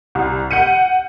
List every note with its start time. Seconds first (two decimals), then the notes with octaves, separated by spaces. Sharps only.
0.15 C2
0.51 F#5 G6 C#7 D#7